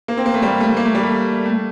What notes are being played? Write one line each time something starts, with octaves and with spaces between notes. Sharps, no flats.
A#3
C4
A#3
A3
G3
A3
A#3
A3
G3
A3
A3